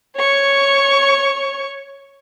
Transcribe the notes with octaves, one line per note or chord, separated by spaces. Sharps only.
C#5 C#6